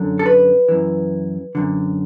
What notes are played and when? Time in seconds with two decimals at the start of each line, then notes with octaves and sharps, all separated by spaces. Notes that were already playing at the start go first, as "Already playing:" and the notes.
Already playing: F#2 D3
0.19 A4
0.26 B4
0.68 F#2 E3
1.55 F#2 D3